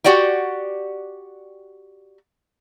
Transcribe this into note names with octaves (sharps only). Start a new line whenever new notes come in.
F#4 G4 D5 F#5 G5